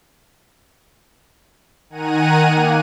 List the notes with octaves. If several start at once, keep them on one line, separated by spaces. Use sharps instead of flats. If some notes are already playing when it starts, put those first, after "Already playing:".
D#3 F#5 G#5 A#5 D#7
A#3